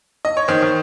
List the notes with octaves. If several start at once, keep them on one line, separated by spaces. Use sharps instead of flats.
D#5
C#5
D#3 C5
D#3